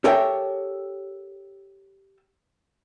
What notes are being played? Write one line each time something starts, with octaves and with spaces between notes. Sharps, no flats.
G4 A4 A#4 C#5 E5 G5